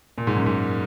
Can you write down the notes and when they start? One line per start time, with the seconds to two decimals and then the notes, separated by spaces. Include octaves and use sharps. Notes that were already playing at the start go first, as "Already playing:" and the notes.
0.18 A#2
0.27 G#2
0.36 F#2
0.46 G#2